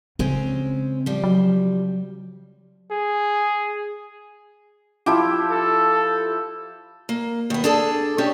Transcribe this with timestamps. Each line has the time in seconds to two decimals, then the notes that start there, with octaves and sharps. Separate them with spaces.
0.19 C#3 G#3 C4 C#4
1.06 F3 G3
1.24 F#3
2.91 G#4
5.06 F3 E4 G4
5.51 A4
7.09 A#3
7.50 D#2 B3
7.64 D4 G#4 A4
8.18 C#4 D4 G4 C#5 D#5